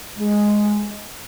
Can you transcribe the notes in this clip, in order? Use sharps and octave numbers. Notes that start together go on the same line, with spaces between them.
G#3